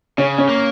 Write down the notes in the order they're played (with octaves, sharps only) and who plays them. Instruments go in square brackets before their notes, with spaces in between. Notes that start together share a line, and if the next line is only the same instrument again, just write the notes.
[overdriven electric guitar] C#3 [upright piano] C#4
[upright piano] C#4
[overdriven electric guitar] A#3